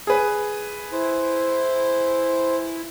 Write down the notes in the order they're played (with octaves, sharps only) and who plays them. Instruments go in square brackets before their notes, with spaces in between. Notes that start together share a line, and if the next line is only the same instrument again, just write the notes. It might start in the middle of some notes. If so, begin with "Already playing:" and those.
[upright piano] G#4 B4
[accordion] E4 [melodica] C5